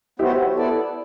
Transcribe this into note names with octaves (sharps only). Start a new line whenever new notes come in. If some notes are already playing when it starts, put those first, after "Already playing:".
F#3 B3 E4 F#4 G4 C5
B3 E4 A4 D5